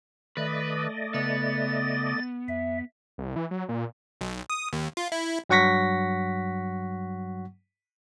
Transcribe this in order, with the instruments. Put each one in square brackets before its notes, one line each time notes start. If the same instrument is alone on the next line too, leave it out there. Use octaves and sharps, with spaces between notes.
[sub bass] D#3 [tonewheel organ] A3 D5 D#5 [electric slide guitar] B4
[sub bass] C#3 [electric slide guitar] B3 [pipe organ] A6
[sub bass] F2 [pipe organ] E5
[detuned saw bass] C2
E3
F#3
A#2
[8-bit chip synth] B1
D#6
D#2
F4
E4
[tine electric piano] G2 F#3 F#5 C#6 A#6 B6